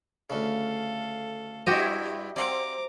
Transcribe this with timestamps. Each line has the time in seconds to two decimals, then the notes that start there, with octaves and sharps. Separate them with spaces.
0.30 D2 C#3 A4 F5
1.67 G2 G3 C4 E4 F#4 G4 D#5
2.36 C4 D5 F5 F#5 A#5 D6